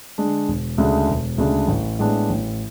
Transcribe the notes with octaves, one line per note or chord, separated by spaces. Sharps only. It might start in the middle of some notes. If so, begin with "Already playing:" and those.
D3 G#3 D4
E1
D2 C#3 G#3 D4
E1
D2 C#3 G#3 D4
A1
A2 G#3 B3 D4
A1